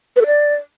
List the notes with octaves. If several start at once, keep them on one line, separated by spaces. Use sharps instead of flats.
B4
A4
D5